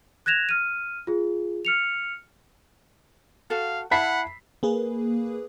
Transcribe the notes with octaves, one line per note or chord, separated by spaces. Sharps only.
F#6 G#6 A#6 E7 F7
F6 D#7
F4 G#4
F6 C#7 F7
F#4 A4 F5
E4 E5 F#5 A5 B5 B6 C7
A#3 G#4 B4